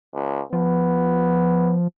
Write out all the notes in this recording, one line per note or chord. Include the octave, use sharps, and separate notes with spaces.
C#2
F3 B3